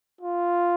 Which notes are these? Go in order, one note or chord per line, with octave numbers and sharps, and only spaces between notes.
F4